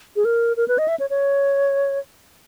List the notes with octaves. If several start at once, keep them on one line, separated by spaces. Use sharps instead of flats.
G#4
A#4
A#4
B4
D#5
E5
C#5
C#5